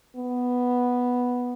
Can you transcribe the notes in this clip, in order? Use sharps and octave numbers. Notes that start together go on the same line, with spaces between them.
B3